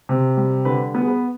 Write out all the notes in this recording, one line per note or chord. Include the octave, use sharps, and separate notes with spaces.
C3
G3
D3 B4
B3
G#4
B4